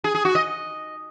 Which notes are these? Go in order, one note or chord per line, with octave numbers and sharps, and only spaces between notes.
G#4
G#4
F#4
D#5